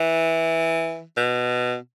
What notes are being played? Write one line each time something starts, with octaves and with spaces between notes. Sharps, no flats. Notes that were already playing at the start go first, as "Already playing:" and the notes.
Already playing: E3
B2